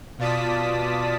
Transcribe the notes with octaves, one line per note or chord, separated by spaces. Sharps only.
B2 F4 D5 A5 D#6 B6